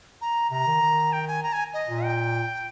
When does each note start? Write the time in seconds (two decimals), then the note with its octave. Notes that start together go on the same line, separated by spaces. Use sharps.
0.21 A#5
0.51 C3 A#5
0.67 D#3
0.82 D#3
1.13 G5
1.28 G#5
1.43 A#5
1.53 G#5
1.74 D#5
1.89 A#2
2.04 G5